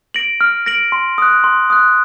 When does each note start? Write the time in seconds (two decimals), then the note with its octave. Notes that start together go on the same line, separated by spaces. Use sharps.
0.14 A#6 D7 F#7
0.41 F6
0.66 A#6 D7 F#7
0.92 C6
1.18 D#6 F#6
1.44 C6
1.70 D#6 F#6